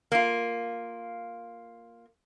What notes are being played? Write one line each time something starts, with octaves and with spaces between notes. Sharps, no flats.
A#3 F4